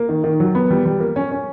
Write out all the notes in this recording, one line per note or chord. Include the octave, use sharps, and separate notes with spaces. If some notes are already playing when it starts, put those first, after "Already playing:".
Already playing: A#3
D#3
D#3
F#3
B3
G3
G3
A#3
C#4
C#4